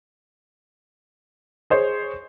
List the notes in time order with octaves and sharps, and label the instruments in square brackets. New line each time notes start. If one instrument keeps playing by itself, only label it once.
[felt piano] G#4 C5 C#5